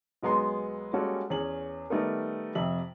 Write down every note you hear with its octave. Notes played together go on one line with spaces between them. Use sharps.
B1 G#3 B3 A#5 C6
G3 G#3 A#3 C#4 F#4 A4
E2 C#4 G#4 F#7
D#3 G3 A3 B3 D#4 A#4
F2 C3 E5 F#7